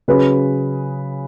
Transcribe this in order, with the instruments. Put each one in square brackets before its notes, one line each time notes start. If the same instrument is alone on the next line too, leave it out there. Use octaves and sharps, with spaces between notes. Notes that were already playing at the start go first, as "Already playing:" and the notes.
[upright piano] C#3 F#3 C#4 G#4 B4